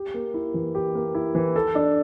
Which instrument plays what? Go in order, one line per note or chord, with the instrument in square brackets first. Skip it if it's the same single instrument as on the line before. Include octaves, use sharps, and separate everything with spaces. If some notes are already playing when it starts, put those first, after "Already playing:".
Already playing: [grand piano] G4
A#3
E4
E3
G4
A#3
E4
E3
A4
D4